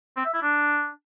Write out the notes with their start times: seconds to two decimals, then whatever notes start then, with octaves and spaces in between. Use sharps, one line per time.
0.17 C4
0.25 E5
0.34 E4
0.42 D4